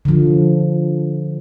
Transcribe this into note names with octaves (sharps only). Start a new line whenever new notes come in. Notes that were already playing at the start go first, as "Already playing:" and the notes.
D3 F3